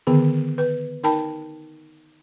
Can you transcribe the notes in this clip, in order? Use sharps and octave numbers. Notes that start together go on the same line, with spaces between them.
D3 D#3 B3 G#4
B4
D#4 A#4 G5 A5 B5